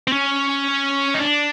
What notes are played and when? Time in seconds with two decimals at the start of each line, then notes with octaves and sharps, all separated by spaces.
0.07 C4
0.12 C#4
1.15 D#4
1.20 D4